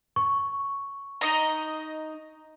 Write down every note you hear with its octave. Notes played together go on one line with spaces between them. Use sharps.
C#6
D#4 D#5 A#5